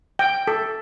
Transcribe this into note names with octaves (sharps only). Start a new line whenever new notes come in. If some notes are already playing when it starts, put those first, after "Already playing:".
G5
A4